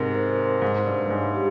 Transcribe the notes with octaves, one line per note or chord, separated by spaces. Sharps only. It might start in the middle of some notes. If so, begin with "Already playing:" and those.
Already playing: G#2 C3 A#4
C5
C5
G#2 G#3
G2 G#3
G2
G#2 C#5
G4